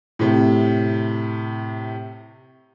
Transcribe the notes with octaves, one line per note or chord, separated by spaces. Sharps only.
A2 C3